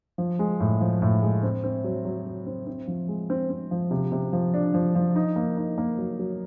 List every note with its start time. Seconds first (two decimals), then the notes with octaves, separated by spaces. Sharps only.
0.18 F3
0.39 G#3
0.60 A2
0.81 F3
1.02 A2
1.22 G#3
1.43 C4
1.64 C4
1.84 F#3
2.05 F#3
2.26 F#3
2.46 C4
2.67 C4
2.88 F3
3.08 G#3
3.30 C4
3.50 C4
3.71 F3
3.91 C3
4.12 C3
4.33 F3
4.54 D4
4.74 F3
4.95 F3
5.16 D#4
5.36 A#3
5.57 D#4
5.78 A#3
5.98 F#3
6.19 F#3